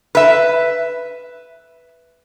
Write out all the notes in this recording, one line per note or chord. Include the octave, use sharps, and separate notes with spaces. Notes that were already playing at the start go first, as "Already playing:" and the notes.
B4 E5